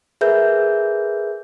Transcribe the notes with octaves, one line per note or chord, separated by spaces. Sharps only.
G#4 A#4 B4 E5 G6